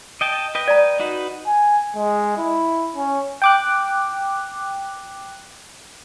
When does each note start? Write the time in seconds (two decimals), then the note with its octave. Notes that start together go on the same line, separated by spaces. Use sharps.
0.21 D#5 G5 A5
0.55 B4 D#5 G5
0.68 D5 A#5
0.99 D#4 F#4 B4
1.46 G#5
1.96 G#3
2.37 E4
2.96 C#4
3.42 G5 D6 F#6